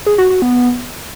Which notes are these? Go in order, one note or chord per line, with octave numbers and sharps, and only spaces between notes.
G#4
F#4
F#4
B3